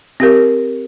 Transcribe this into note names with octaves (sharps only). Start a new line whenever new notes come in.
C4 G4 A#4